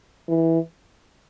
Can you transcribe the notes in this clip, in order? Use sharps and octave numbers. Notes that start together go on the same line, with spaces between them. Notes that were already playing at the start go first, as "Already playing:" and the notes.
E3